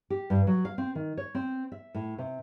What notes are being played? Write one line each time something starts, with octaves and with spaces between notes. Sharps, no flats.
G4
G2
F#3
F5
C4
D#3
C#5
C4
E5
A2
C3